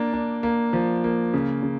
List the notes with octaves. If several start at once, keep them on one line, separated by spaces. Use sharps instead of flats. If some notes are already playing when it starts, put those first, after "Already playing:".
Already playing: A#3 D4
D4
A#3
F3
A#3
C#3
C#3